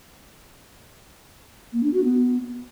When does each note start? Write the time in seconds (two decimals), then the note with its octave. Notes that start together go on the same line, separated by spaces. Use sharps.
1.73 A#3
1.83 D4
1.94 F#4
2.04 B3